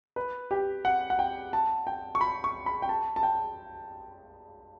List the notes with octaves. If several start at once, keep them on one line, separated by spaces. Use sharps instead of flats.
B4
G4
F#5
F#5
G5
A5
G5
C#6
B5
C#6
B5
G5
A5
A5
G5